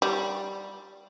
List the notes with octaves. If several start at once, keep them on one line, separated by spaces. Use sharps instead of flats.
G3